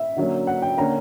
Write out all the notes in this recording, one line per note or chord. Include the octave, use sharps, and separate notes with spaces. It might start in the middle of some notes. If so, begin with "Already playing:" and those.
Already playing: E5
D3 F#3 A#3 C#4
F#5
G5
D3 A#3 C#4 A#5